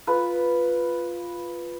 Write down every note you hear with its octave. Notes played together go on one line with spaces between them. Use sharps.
F4 B4